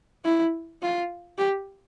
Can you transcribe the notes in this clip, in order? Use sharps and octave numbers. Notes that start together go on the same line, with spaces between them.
E4
F4
G4